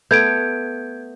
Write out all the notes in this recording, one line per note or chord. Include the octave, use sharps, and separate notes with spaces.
A3 B3 G6 G#6 D7